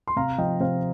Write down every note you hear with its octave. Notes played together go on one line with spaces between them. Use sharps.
C6
C3 F5 A#5
F3 D#5 G5
C3 C5 F5